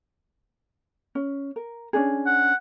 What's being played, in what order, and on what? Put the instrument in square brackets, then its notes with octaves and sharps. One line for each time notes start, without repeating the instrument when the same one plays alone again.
[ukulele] C#4
A#4
C#4 D4 G#4
[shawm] F#5